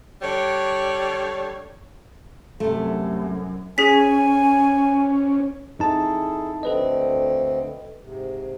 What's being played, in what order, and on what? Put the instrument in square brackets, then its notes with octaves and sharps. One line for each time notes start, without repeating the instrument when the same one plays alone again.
[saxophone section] D3 G3 C#5
[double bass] C2 F#2 [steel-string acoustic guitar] C3 A3
[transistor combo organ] C#4 [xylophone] G#4 B6 [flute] G#5
[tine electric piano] F2 D#4 A5 [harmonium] E4 G#4 A4
[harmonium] D2 D3 C4 [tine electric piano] A4 B4 D#5
[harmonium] G#2 C3